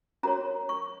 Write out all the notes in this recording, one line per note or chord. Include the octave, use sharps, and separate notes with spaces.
C#4 F#4 A#4 C#5 A#5
C#6